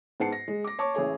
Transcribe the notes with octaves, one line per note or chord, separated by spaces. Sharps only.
G#2 B3 F#5 A5 C7 C#7
A#6
G#3
D6 A#6
C#5 A5 C#6 D6
A1 E3 G#4 C#5